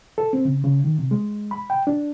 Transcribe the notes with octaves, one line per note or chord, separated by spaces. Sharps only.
A4
C4
C#3
C#3
D#3
C3
G#3
B5
G5
D4